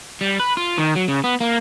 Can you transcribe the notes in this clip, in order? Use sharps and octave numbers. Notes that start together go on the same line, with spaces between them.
G3
B4
F4
D#3
F#3
C#3
B3
A#3